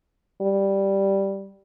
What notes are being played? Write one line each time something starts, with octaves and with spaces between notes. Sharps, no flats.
G3